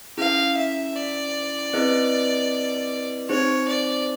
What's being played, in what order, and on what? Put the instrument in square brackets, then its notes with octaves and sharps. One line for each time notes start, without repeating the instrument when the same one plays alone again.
[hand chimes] C#4 E4 G#4 [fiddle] F5
[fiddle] E5
D5
[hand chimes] C4 E4 G#4 B4 D#5
[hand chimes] C4 D#4 G#4 C5 [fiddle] C#5
[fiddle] D5